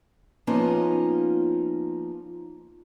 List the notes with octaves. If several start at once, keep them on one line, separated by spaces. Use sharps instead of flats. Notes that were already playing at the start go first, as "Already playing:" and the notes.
F3 A#3 B3 C#4 D#4 F4